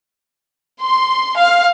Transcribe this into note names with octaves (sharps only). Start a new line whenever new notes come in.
C6
F5